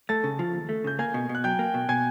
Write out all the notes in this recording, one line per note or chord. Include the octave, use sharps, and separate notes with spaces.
A3 A5 A6
C#3
F3
D#2
A3
C#3 G6
A#3 G#5 G#6
B2
B2
F#6
F#3 G5 G6
A#3
B2
B2 G#5 G#6